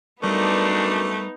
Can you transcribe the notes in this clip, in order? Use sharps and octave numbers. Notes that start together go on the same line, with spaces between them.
F#2 G3 A3 B3 D4 D#4 A#4 B4